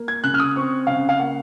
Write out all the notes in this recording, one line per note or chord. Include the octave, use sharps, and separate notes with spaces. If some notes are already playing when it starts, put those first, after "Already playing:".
Already playing: A#3
G#6
C#3 F#6
F6
D#6
C4 C#6
C#3 F5
F5
A#3 F#5